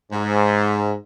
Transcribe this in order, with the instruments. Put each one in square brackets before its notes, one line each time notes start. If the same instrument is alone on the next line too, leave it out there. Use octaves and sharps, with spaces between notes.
[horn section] G#2